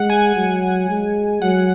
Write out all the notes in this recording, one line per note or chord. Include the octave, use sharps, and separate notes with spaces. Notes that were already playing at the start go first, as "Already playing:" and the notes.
Already playing: G#3 F#5
G#5
F#3 G#5
G#3
F#3 F#5